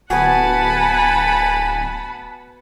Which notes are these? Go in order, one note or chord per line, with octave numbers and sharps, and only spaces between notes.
D1 B3 F#4 F#5 G#5 A5 B5